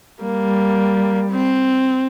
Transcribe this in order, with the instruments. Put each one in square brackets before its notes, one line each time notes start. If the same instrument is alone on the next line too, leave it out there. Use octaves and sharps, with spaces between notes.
[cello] G3 [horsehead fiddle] A#3
[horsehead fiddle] C4